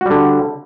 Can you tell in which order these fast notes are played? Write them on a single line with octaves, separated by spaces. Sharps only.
F#4 G3 D3